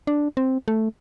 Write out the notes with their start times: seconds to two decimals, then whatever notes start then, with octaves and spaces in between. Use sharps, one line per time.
0.07 D4
0.37 C4
0.68 A3